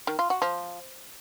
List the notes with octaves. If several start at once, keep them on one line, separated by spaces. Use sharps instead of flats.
D#3
F4
F#4
F3